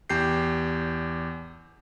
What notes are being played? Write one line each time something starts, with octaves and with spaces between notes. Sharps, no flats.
E2 G4 G6 C7